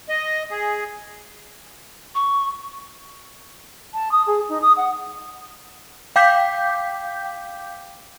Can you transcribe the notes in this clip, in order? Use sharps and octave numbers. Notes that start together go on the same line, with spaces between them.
D#5
G#4
C#6
A5
D#6
G#4
D#4
D#6
F#5
F5 G5 D6 G6 B6